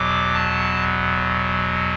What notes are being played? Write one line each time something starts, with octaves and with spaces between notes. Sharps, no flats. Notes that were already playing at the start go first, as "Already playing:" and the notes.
Already playing: E2 B2 F#3 D6
A5